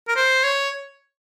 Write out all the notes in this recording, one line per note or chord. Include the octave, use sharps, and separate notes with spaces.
A#4
C5
C#5